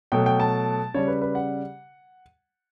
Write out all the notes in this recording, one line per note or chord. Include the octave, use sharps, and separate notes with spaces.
B2 F#3 A3 G5
G5
A5
C#3 G3 C#5
B4
B4
F#5